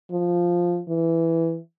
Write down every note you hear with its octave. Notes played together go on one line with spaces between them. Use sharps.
F3
E3